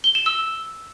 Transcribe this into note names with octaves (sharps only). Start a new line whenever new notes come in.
G7
E7
E6